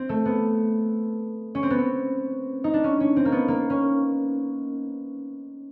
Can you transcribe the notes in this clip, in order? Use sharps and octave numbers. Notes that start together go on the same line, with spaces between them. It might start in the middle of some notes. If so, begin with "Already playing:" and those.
Already playing: C4
A3
B3
C#4
C4
B3
C4
D#4
D4
C#4
C#4
C4
A#3
B3
A#3
C#4